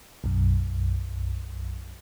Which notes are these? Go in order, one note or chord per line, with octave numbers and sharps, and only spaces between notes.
B1 F#2